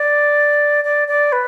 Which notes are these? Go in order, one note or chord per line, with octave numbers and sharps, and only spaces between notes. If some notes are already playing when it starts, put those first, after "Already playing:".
Already playing: D5
D5
D5
B4